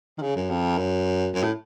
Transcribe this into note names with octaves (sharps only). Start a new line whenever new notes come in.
D#3
C#3
F#2
F2
F#2
F#2
A2